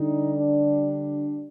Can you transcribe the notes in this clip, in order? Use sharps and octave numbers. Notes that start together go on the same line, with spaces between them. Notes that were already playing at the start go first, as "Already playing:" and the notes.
Already playing: D3 G3 D#4
D4